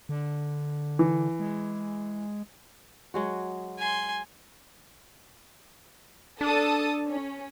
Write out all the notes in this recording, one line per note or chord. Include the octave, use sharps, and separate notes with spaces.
D3
E3
G#3
F#3 G#3 F#4
G#5 C6
D4 A4 A5 D#6
C#4